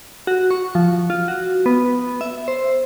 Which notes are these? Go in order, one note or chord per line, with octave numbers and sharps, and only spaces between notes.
F#4
C#6
F3
F4
F#4
B3
E5
C5